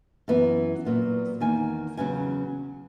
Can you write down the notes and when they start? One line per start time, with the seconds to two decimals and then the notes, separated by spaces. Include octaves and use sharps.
0.28 F#2 E3 B3
0.85 A#2 F#3 B3
1.40 E2 D#3 A#3 G#5
1.97 E2 C#3 F#3 C#4 G#5